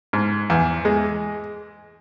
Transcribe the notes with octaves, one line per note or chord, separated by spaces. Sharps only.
G#2
E2
G#3